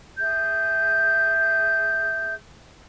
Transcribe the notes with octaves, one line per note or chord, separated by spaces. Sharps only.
G#4 E5 G6